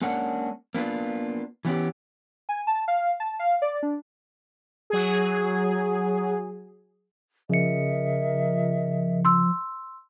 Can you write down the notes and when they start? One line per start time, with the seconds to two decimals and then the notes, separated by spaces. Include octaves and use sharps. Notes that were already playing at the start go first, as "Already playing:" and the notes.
0.01 G#3 A#3 C#4 D4 F#5
0.74 A#3 B3 D4 F4
1.65 E3 B3 C#4 G4
2.49 G#5
2.67 A5
2.88 F5
3.20 A5
3.39 F5
3.62 D5
3.83 D4
4.90 F#3 G#4
7.49 C#3 F3 A#4 D#5 E5 C#7
9.25 C6 E6